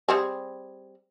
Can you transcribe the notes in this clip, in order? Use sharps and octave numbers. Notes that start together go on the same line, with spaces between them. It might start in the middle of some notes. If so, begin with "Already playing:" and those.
G3 C4 G#4